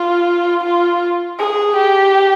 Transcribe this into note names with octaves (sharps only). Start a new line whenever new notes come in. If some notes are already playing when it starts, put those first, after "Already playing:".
Already playing: F4
F4
G#4
G4